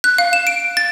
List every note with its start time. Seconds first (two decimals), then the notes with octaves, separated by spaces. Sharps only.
0.04 F#6
0.18 F5
0.33 E7
0.47 D7
0.77 A6